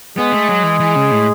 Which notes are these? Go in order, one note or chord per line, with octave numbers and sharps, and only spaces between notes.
G#3 B3 G#4
A3
F#3
E3
E3
C#3
A2